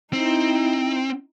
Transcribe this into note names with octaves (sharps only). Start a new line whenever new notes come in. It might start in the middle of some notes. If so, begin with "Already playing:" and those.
C4 D#4 E4